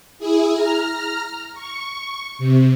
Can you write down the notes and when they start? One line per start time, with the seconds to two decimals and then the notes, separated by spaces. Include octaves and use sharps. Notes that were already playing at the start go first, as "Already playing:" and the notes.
0.19 E4 G#4
0.55 A#5 F6
1.54 C#6
2.39 C3